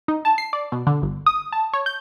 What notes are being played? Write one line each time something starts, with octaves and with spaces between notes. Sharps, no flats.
D#4
A5
C7
D5
B2
D3
G1
D#6
A5
C#5
G6